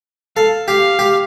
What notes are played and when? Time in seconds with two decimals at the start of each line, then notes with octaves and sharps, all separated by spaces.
0.36 A4 F5
0.68 G4 F5
0.99 G4